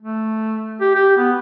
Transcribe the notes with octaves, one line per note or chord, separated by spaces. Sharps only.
A3
G4
G4
B3